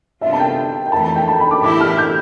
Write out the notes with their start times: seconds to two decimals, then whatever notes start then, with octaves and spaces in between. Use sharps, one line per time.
0.21 C3 G3 B3 D4 F4 E5
0.33 A5
0.40 G5
0.86 G5
0.92 F2 E3 A3 A5
1.04 A5
1.16 G5
1.28 A5
1.40 B5
1.51 D6
1.63 A2 E3 A3 E4 G4 D6
1.81 F6
1.98 G6